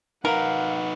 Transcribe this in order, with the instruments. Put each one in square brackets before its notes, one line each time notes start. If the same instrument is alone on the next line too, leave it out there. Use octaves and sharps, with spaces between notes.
[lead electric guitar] D#4 B4 [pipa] A#4 [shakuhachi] F5 [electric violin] F#5